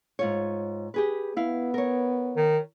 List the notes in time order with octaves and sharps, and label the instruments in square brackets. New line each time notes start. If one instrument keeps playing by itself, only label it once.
[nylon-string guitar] G#2 F4 C#5
G4 G#4 B4
[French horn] B3 [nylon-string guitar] E4 F5
[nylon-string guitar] A#4 C#5
[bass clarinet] D#3